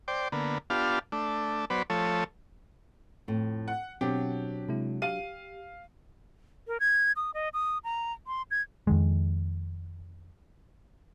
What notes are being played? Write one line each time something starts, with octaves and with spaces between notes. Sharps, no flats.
C5 D5 G5
D3 A#3 B3
B3 D4 F4 G4 F5 A5
A3 D4
F#3 B3 B4 C5 D5
F3 A3 A4 C#5
F2 A2
F#5
B2 F#3 C4 D4 G4
C3 G#3 E4
G4 F5 D#7
A#4
G#6
D#6
D#5
D#6
A#5
C6
G#6
F2 D#3 G#3